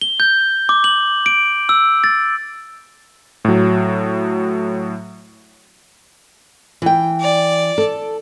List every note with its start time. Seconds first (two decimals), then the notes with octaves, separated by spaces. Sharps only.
0.01 G7
0.20 G6
0.69 D6
0.84 F#7
1.26 D7
1.69 E6
2.04 A6
3.45 A2 F#3
6.82 E3 G5
7.21 D5
7.78 A4